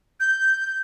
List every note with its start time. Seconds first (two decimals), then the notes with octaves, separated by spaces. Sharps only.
0.20 G6